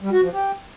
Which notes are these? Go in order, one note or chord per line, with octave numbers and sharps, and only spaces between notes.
G3
F#4
F3
G4